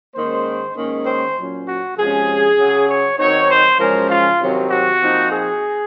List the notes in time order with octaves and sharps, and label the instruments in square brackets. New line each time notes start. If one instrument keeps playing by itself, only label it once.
[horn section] G#2 D#3 A#3 C#4 C5
G#2 D#3 A#3 C#4
C5
A#2 F#3 C#4
F#4
C3 F3 G#3 C#4 G#4
C#3 F#3 C#4
C#5
D#3 F#3 C4 D#4 C#5
C5
F#2 C#3 F3 G#3 C#4 A#4
F4
C3 D#3 F#3 C4
F#4
A#2 F3 C4 D#4
G#4